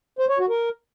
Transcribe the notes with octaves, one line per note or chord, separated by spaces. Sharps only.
C5
C#5
F#4
A#4